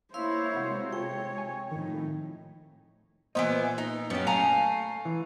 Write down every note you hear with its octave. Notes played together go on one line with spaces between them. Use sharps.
A#3 E4 C5 C#5 F5 C6 E6
C3 G#3 F#4
F4 A4 C#5 G5
G#5
F2 A2 D#3 D#4
A#2 E3 A#3 B3 C5 D#5
D#4
F#2 F#3 B3 C#4 G4
A3 F5 G#5 A#5
E3